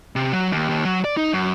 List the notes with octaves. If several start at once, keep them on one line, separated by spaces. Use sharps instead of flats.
C3
F#3
D#2
D#2
F#3
D5
D#4
F#2